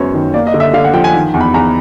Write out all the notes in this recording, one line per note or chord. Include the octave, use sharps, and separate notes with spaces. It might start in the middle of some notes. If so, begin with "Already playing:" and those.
Already playing: F#2 G#3 B3 A#4 C5 C#5
D#3
A#3 D5
D#5
D3
E5
D3 F5
F#5
F3 G5
G#5
D#3
E2
B5
E2 A#5